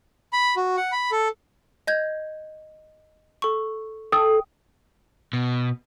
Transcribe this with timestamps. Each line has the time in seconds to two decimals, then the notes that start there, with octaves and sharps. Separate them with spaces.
0.33 B5
0.56 F#4
0.77 F#5
0.92 B5
1.12 A4
1.87 D#5 G6 G#6
3.42 A4 C#6
4.12 A4 G5 D#6
5.33 B2